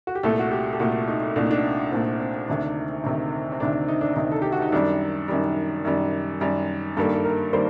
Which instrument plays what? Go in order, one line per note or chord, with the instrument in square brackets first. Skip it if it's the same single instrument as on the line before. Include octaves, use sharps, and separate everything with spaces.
[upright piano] F#4
G4
C2 A#2 A3 A4
F#4
G4
G4
C2 A#2 A3 F#4
D#4
C2 A#2 A3 D4
D#4
D4
C2 A#2 A3 C4
C4
D2 C3 D#3 D4
D2 C3 D#3
C4
D2 C3 D#3 D4
D#4
D4
D2 C3 D#3 D#4
A4
G4
F#4
D#4
F#2 D#3 G3 D4
F#2 D#3 G3
F#2 D#3 G3
F#2 D#3 G3
G2 D#3 G3 A#3 A4
A4
A#4
D#3 G3 A#3 C5